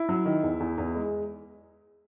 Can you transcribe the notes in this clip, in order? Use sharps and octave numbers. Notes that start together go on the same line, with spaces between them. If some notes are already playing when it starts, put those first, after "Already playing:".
Already playing: E4
F#3
D#3
E2
E2
E2
G#3